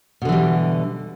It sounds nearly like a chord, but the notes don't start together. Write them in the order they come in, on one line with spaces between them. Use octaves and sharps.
B2 D3 E3 G3